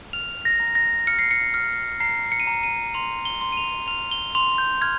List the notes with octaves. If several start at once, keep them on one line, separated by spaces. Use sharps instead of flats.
F6 F7
A#6
A#5
A#6
F6 C#7
C7
C#7
F6
A#5 C7
C#7
D#7
A#5 C#7
D#7
C6 F7
G7
C6
D#7
F7
F6 F7
G7
C6 F7
G6
F6 G#6